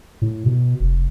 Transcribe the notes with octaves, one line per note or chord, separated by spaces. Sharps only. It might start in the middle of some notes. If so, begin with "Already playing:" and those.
A2
B2
F1